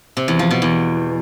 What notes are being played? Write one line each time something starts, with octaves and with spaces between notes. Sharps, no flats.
C3
E2
F3
B2
E2